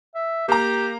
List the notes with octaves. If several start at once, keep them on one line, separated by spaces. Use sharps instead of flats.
E5
A#3 G4 A#5